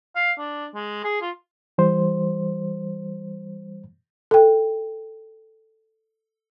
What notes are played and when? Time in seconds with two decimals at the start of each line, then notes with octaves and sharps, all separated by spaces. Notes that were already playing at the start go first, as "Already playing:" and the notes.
0.16 F5
0.39 D4
0.75 G#3
1.04 G#4
1.22 F4
1.78 E3 G3 C5
4.31 A4 G5